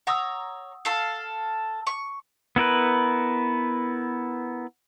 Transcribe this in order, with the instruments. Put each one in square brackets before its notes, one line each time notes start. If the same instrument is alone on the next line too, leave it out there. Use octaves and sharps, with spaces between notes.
[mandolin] C#5 A#5 [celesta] F#5 D#6 E6
[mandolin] A4 F5
C#6
[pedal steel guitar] B3 E4 A#4 B4